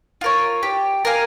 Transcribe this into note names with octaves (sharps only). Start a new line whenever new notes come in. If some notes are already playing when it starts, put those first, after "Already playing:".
F4 A#4 C#5
G4
A#4 F5 G#5